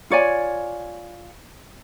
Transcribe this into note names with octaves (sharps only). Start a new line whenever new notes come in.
F4 C#5 D5 G#5